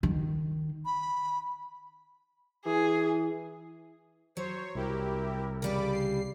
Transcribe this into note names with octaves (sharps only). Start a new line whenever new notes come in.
D#3
B5
E3 G#4
F#3 C5 C#5
C2 E4 G4 A#4
C#3 G3 G4 D5 B5 D6
C7